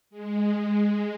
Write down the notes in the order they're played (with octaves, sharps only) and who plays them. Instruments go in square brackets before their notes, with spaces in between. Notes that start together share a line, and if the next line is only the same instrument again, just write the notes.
[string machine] G#3